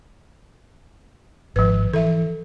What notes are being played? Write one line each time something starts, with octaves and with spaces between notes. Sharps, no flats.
G#1 F3 B4
E3 A4 E5